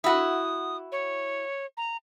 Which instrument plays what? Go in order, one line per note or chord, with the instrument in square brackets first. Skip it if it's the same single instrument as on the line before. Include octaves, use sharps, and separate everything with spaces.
[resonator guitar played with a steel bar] E4 F#4 [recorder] D#6
[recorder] C#5
A#5